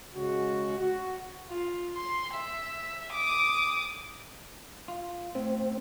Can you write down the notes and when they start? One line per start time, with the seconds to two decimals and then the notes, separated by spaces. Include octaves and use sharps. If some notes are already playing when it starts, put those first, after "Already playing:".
0.16 C#3 G#3 F#4
0.79 F#4
1.49 F4
1.96 C6
2.34 E5
3.13 D6 D#6
4.88 F4
5.35 A2 C4